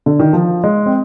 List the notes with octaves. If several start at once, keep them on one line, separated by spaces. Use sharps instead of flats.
D3
D#3
F3
G#3
C4